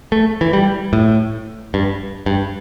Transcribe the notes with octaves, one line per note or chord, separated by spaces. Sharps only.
A3
E3
G3
A2
G2
G2